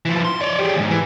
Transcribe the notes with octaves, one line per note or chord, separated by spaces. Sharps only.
E3 F3
C6
C#5 D5
G4 G#4
D#2 G#2
E3